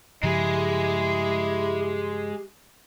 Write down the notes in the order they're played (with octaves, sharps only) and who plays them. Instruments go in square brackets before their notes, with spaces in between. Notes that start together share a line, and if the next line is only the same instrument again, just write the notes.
[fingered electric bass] G2 C#3 F3 [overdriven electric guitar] G#3 G#4 [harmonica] E4 [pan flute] G4